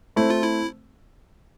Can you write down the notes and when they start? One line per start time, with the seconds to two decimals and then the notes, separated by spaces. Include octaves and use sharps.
0.16 A3 C4 E4
0.30 F4
0.44 E4